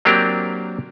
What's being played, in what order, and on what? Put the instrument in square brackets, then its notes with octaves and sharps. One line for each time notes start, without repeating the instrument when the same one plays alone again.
[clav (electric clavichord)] F#3 A#3 C4 D4 G4 A#4